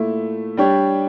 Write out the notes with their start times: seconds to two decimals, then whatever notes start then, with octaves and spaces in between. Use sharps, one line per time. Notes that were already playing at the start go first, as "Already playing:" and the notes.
Already playing: A#2 A3 E4
0.57 G3 D4 G4 C#5